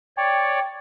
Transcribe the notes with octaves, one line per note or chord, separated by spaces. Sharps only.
C#5 D5 G5